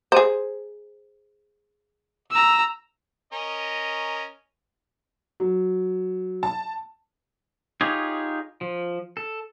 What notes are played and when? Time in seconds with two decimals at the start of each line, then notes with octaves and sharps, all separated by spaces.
0.12 G#4 C5
2.32 A#5 E6
3.33 C#4 A#4 D#5
5.40 F#3
6.43 A5
7.81 D#4 F4 G4 G#4 C#5
8.61 F3
9.17 A4